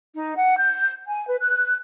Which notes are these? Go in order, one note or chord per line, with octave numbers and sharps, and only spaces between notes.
D#4
F#5
G6
G#5
B4
F#6